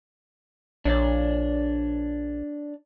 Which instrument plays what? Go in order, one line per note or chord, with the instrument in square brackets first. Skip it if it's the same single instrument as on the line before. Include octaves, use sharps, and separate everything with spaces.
[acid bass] A#1 [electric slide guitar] D4 C#5 D5